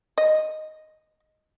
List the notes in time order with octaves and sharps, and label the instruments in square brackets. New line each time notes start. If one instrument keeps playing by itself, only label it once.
[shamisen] D#5